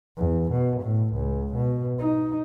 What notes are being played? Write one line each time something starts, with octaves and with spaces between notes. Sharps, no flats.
E2
B2
A2
C#2
B2
D#4